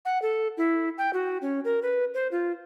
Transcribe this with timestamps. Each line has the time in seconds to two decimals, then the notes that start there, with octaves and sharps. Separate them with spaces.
0.05 F#5
0.22 A4
0.57 E4
0.98 G5
1.13 F#4
1.42 C#4
1.65 A#4
1.82 B4
2.14 C5
2.31 F4